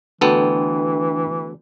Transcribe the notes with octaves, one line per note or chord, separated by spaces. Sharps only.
D2 E3 B3 D4 A4 G5